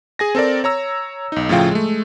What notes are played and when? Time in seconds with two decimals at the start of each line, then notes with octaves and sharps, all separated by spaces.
0.19 G#4 G#5 A#6
0.35 C4 A4 A#4 D5
0.64 C#5 A#5 E6
1.32 B1 D#4
1.49 A2 C#3 F3 F4 G5
1.71 G#3 A3